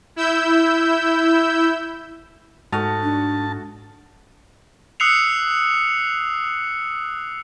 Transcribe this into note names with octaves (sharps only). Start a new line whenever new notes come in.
E4 E6 G6
G#2 A3 F#4 A5 D#6 F6
D4
D#6 E6 F#6 C7 C#7 F7